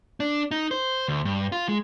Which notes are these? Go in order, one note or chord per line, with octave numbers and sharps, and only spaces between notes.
D4
D#4
C5
D2
G2
F4
G#3